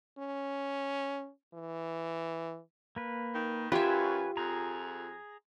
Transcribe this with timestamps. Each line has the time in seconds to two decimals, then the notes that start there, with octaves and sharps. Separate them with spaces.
0.18 C#4
1.54 E3
2.96 A#3 B4
3.35 D#3
3.72 F#2 F4 G4 B4 C#5 E5 G#5
4.37 F2 G#4 A#5